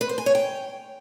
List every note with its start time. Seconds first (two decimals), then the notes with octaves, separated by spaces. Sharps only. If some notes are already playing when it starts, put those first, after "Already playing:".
0.01 B4
0.09 C5
0.18 G#5
0.26 C#5
0.35 G5